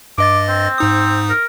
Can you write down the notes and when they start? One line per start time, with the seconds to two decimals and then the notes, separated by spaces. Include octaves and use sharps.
0.18 G2 D#5 D6 A6
0.49 C4
0.78 G#2 D#4 D#6
1.30 A#4